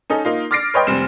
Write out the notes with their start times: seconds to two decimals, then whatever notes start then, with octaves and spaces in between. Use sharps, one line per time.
0.10 C#4 D#4 A4
0.25 A#3 D#4 F4
0.51 D6 F6 A6 A#6 C7 D7
0.74 B4 C#5 D#5 G5 C6
0.87 F1 G3 C4 E7